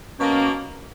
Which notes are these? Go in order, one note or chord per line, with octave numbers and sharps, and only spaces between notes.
B2 F#3 A#3 C#4